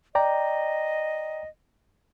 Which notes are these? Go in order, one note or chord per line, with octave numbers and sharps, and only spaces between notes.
D5 D#5 G5 A#5